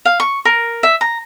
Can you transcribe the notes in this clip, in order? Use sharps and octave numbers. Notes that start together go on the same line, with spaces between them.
F5
C#6
A#4
E5
A#5